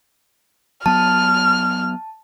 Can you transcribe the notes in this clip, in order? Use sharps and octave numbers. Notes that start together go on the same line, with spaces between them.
F#3 B3 A5 F6